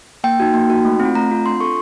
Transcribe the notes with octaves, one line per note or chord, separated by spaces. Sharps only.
A#3 G5
D#4 F#4
A#3
D#4 F#4
A3
C4
F4
A3 A#5
C4 F4
D4 C6
F4 A4 C#6